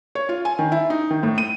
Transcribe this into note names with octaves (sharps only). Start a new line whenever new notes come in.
C#5
F4
G#5
D#3
E4
D#4
D#3
A2
D#7